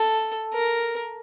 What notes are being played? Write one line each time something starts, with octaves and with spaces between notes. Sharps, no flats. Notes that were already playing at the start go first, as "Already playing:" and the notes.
Already playing: A4
A#4